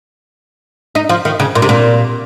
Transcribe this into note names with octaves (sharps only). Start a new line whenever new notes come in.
D#4
F3
D#3
C#3
A#2
C3
A#2